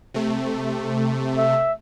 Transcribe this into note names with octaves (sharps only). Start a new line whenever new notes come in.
C3 A3
E5